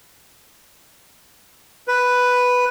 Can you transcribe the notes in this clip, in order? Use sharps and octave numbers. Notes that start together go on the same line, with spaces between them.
B4